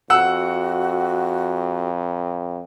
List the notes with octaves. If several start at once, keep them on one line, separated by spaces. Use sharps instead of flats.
F2 F#4 F#5 E6